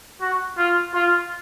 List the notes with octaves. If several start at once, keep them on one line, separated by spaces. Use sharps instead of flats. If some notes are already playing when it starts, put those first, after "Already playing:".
F#4
F4
F4